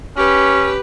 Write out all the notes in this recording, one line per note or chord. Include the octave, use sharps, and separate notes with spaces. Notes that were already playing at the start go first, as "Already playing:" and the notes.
C#4 G4 B4